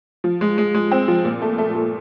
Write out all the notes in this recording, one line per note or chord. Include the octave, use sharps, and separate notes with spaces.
F3
G#3
G#3
G#3
C4
F3
A#2
A3
A3
A3